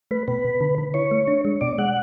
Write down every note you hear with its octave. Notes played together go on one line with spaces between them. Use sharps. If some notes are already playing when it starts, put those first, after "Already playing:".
A3 B4
B2 B4
B2
D3
D3
E4 C#5
A3
D4
G#3
B2 D5
G#3 F#5